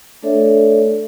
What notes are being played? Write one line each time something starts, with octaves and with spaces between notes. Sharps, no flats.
A3 D4 A4 C#5 D5 E5